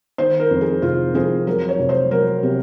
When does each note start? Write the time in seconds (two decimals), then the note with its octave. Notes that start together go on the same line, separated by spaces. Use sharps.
0.18 D#3 C5
0.40 A#4
0.51 F2
0.61 G#4
0.82 F1 F4
1.14 F2 G#4
1.47 F#3 A#4
1.69 C#5
1.78 F1
1.89 C5
2.11 F#3 A#4
2.43 C3